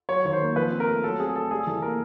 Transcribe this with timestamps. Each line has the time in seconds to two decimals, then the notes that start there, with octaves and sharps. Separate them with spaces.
0.09 F#3 C#5
0.25 D#3 C#5
0.33 C5
0.40 A#3
0.56 F3 B4
0.72 C4
0.80 A#4
0.88 A3
1.04 F#3 A4
1.19 C4 G#4
1.35 A3 A4
1.51 G3 G#4
1.67 E3 A4
1.82 A#3 A#4